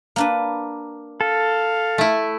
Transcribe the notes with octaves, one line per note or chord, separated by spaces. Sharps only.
A#3 D4 B4
A4 F5
A3 E4